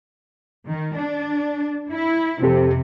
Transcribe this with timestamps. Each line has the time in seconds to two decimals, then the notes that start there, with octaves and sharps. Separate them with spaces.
0.68 D#3
0.98 D4
1.91 E4
2.43 F2 C3 C4 G4 A4